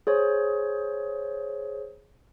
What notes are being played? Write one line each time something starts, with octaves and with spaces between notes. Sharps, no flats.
G#4 C5 C#5